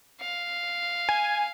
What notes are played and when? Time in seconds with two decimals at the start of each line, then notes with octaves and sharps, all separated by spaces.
0.20 F5
1.09 G#5